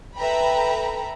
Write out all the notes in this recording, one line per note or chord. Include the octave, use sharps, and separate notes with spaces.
A4 B4 E5 G5 A#5 B5